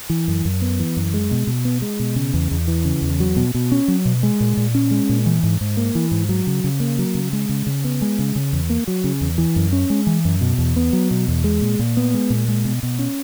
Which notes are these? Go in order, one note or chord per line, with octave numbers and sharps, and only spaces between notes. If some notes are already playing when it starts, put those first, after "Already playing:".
E3
F#2
F#2
B3
E3
F#2
G#3
B2
B2
B3
G#3
B2
C#3
E2
E2
E3
C#3
E2
F#3
B2
B2
C#4
F#3
B2
G#3
A#2
A#2
C#4
G#3
A#2
E3
G#2
G#2
A#3
E3
G#2
F#3
C#3
C#3
A#3
F#3
C#3
G#3
C#3
C#3
B3
G#3
C#3
C#3
E2
A#3
F#3
C#3
E2
E3
F#2
C#4
G#3
E3
F#2
B2
E2
B3
F#3
B2
E2
G#3
A#2
A#2
B3
G#3
A#2
G#3
B2
B2
C#4